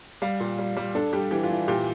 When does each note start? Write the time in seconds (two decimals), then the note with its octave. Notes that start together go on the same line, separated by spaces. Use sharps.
0.22 G3 F5
0.40 A#2
0.59 G3
0.77 G3
0.95 D4 A4
1.13 G3 G4
1.31 E3 G4
1.43 F4
1.50 E3
1.68 A#2 G4